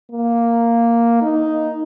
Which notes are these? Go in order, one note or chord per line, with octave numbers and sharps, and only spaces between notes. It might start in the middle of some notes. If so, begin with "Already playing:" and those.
A#3
D#4